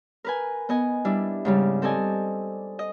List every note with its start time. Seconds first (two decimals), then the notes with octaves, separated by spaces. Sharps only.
0.24 A#4 B4 G#5
0.69 B3 D#5 G#5
1.05 G3 D4 E4
1.45 G#2 C#3 G3
1.82 C4 A4 D5 D#5 G#5
2.79 D#5